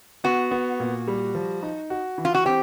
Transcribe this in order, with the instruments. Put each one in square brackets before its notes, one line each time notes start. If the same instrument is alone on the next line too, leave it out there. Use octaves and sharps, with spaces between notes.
[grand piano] B3 [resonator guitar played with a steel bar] F#4
[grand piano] B3
A#2
G3
F3
D#4
F#4
E3
[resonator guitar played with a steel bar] F4
F#4
[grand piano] C4 [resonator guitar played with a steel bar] G4